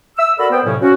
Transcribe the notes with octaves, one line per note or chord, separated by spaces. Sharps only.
E6
F#4 A4 A#4 D5 B5
B3 C5 G5
F2 A2 C3 F#3 C#4 E4
C#4 F#4